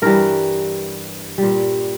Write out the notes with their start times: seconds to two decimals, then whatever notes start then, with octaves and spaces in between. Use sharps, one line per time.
0.02 G2 E3 G3 A#4
1.38 A#2 G3